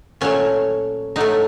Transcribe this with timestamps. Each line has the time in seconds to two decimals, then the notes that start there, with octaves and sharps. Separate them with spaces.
0.21 A#2 F#3 A3 C#4
1.16 A2 F#3 A3 D#4